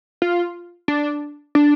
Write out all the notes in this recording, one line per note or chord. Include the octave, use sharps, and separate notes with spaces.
F4
D4
D4